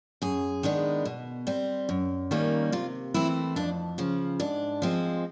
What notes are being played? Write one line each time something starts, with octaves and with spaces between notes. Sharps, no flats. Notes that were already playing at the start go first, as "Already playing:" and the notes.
F#2 G#4
D#3 G#3 B3 D4
B2
G3 C4
F#2
D#3 G3 A#3 C#4
C3 F4
E3 A3 C4 E4
F2 D4
C#3 F3
G#2 D4
F3 G#3 C4